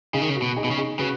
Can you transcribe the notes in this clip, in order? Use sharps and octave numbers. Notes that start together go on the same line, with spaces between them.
C#3 D#4 G#4
D#3
C#3
F#4
B2
D#4 G#4
B2
C#3
D#4 G#4
C#3 F#4 B4